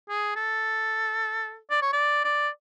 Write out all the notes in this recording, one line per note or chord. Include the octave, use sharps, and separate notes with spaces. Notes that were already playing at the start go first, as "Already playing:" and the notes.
G#4
A4
D5
C#5
D5
D5